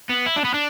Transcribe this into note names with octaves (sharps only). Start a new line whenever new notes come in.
B3
E4
D4
B3
D4